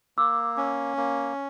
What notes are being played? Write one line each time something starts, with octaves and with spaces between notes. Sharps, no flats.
A#3 D6 E6
C#4
A#3